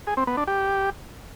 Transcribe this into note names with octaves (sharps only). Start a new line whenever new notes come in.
G#4
C4
B3
D4
G4